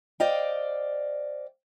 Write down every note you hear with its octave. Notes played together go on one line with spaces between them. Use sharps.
C5 D5 D#5 F5 G5